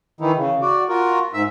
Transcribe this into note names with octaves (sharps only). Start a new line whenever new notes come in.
D#3 E3 D#4 E4
C#3
F#4 D5
F4 F#4 A#4
G#2 E5